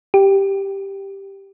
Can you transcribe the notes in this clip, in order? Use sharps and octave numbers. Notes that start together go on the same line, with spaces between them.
G4